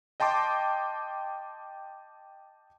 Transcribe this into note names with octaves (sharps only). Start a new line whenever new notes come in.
D#5 G5 A5 C6 D6